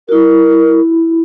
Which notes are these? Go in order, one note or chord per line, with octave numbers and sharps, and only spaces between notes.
E4 F#4 A#4